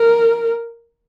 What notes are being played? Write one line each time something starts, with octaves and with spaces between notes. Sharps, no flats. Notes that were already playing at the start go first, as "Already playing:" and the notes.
Already playing: A#4